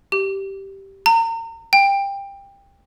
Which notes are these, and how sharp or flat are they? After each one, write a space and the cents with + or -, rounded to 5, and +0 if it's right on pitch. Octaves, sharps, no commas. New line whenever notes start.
G4 -10
A#5 -35
G5 +20